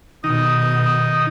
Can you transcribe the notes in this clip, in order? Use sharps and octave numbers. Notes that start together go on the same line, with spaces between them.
B2 D#3 D#4 D#6